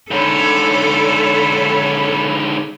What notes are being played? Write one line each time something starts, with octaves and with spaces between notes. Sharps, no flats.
G#2 D3 A4 C#5 B5